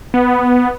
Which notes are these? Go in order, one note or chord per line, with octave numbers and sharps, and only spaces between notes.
B3